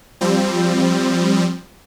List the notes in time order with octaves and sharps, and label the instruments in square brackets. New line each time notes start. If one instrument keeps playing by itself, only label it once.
[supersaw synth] F3 G3 C4